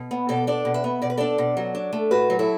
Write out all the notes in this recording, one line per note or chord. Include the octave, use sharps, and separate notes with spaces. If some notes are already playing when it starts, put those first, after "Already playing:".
Already playing: B2
B3
B2 A4 D5
D4 A4 D5
B2
B4 E5
B3
B2 D5
B4
D4 A4 D5
B2
F#3
D4
A3
A2 F#4 B4
F#3
E4 A4